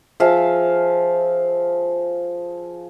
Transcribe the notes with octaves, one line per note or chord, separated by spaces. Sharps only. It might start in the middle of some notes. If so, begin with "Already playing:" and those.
F3 G#4 E5 F5